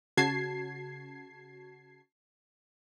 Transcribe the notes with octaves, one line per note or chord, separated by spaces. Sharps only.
C#3 F#4 A5 G#6 C7